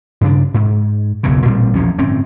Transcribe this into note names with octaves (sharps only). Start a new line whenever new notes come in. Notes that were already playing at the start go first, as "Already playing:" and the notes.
G2 C#3 D4
G#2
F#1 B1 E2 C#3
A1 A#2 G3 C4
A#1 E2 F3 C#4
G1 A2 C4 C#4